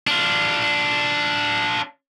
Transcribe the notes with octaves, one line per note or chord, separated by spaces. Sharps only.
D4 F4